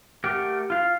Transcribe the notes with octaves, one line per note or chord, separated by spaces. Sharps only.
A3 G4 A#4 F#5 G5
F4 F5